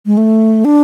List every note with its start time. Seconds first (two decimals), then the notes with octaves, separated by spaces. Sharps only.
0.06 G#3
0.17 A3
0.65 D4